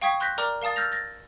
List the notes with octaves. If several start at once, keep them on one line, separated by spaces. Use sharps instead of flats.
F5 G5 C#6 D#6 G#6 B6
C6 F#6 G6 A#6 B6
A#4 D5 A#5 D6 F6
A#4 F5 A5 D#6 A6
E6 F6 G6 A6 A#6 F7
A6 A#6